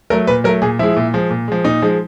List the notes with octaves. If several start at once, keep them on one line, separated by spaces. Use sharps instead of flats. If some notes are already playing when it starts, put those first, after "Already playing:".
F#3 A3 A#4
A#2 B4
F#3 A3 A#4
A#2 G#4
F3 G#3 E4
A#2
F3 G#3
A#2
F3 G#3
A#2 D#4
F3 G#3